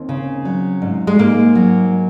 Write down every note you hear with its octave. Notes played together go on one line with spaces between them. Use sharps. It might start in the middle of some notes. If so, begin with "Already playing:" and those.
Already playing: D#2 C4
C#3
F#3
G#2
G#3
G#2 A#3
F#3